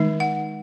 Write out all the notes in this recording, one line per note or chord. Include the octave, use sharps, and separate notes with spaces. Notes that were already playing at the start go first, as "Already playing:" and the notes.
Already playing: D#3 G#3 D#4
F#5